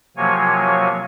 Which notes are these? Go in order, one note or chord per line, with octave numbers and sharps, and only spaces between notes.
C3 F3 F#3 A#3 C#5 G#5